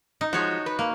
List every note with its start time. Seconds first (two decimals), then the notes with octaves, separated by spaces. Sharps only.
0.21 D#4
0.33 F3 G#3 F#4 C#5
0.66 B4
0.79 A#3